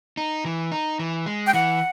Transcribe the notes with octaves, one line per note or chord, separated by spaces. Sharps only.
D#4
E3
D#4
E3
G#3
G5
E3 F#5